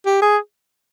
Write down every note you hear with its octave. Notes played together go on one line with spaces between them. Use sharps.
G4
G#4